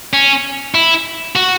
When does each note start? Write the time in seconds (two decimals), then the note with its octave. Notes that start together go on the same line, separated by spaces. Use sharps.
0.13 C#4
0.75 E4
1.35 F#4